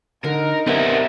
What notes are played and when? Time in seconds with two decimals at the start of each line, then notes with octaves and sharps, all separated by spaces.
0.24 D3 D#4 A#4
0.67 G3 B3 C4 A#4 E5